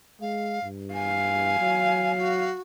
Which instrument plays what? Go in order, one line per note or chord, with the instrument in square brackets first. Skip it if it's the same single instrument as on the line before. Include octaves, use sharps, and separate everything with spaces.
[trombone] G#3 [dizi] F5
[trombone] G2
[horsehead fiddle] F5 [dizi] G#5
[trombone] F#3
[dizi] F#4